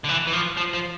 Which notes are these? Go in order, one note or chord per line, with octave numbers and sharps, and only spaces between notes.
D3
E3
E3
F3
F3
F3